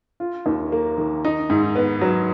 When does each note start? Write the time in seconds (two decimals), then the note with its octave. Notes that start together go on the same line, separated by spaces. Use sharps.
0.20 F4
0.46 D#2
0.72 A#3
0.97 D#3
1.25 D#4
1.50 G#2
1.75 B3
2.01 F#3